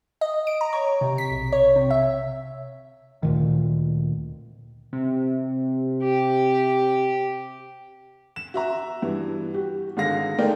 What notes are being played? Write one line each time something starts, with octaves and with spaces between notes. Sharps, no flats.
D#5
D7
A#5
C#5
C3
B6
B1
C#5
C3
E5
D2 A#2 D#3
C3
G4
E7
F#4 E5 A#5
G2 E3
F#4 G4
G#1 D3 G#4 F5 A#6
G#3 A3 D#4 A#4 D5 G5